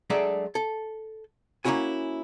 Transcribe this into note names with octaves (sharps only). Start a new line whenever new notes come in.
F#3 G#3 A3 D4 D5 E5
A4
A#3 C#4 D#4 E4 F#4 G#5